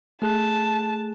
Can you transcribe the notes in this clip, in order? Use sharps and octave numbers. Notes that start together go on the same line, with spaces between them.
A3 G#4 A5 F#6